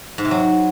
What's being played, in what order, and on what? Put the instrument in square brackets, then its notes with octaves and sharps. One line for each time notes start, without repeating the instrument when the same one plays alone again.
[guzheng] G#2
C3
F#3